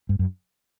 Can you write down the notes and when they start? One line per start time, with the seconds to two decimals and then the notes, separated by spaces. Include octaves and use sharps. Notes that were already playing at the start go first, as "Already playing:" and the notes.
0.09 G2
0.19 F#2